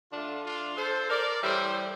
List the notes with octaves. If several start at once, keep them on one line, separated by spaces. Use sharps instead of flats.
D3 A3 D4 F4
D4 F4
A4 C5
A#4 D5
A2 E3 G3 C5 E5